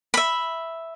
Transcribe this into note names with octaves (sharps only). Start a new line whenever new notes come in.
E5 B5